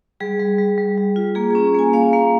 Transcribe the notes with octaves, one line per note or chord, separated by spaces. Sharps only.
G3 G#4
G3
G3
G3
G3
F4
A#3 G#4
C#4 G#4
A#3 G#5
A#3 F5
A#3 F5